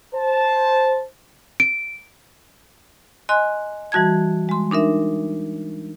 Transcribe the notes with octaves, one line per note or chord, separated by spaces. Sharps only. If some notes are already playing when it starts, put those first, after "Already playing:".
C5 A5
D7
D#5 G#5 C6 F#6
E3 G3 F#4 A5 G#6
G#3 C6
D4 D#4 A#4 E5